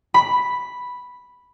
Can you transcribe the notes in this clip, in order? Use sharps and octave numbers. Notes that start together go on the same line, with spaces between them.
B5